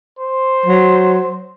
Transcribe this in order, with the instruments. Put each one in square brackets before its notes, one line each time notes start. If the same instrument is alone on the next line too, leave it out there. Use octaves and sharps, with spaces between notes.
[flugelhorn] C5
[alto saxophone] F#3